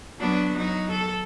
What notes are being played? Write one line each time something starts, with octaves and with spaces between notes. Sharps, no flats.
F#3 B3 D4
F#3 D#4
A4